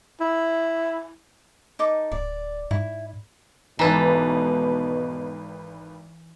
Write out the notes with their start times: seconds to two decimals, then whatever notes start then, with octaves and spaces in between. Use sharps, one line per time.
0.20 E4
1.79 D#4 A4 D6
2.12 D1 D5
2.71 G#2 E4
3.79 G#1 B2 E3 A4 B4 A#5